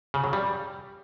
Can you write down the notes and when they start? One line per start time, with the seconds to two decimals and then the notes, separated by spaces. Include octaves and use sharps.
0.14 C#3
0.24 F#3
0.33 G3